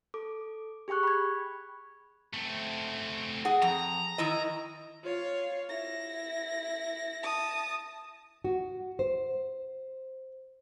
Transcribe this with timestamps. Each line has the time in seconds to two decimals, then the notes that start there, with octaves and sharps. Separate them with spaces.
0.14 A4 D6
0.88 G4 G#4 G5 C#6 F#6
1.03 B5 G#6
2.34 A3 C4
3.45 G#4 F#5
3.62 F2 A#5
4.18 D#3 E4 D#5
5.03 F4 C#5 F5
5.68 E4 A#6
7.23 A5 D#6
8.44 F#4
8.99 C5